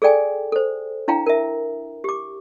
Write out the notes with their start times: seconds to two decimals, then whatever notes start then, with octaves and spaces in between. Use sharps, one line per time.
0.02 G#4 A4 D5 G5 G#5
0.52 A4 C5
1.08 D4 E4 F5 G5 A#5
1.26 A#4 E5
2.04 G4 D6